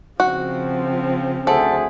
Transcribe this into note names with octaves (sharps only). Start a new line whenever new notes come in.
C#3 F3 C4 F#4
D2 G#4 A4 C5 E5 F#5